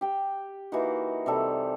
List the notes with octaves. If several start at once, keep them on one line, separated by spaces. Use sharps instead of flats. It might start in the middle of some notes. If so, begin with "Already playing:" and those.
G4 G5
E3 A#3 D#4 F#4
C3 G3 A4